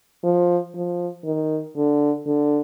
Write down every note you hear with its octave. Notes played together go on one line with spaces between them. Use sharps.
F3
F3
D#3
D3
D3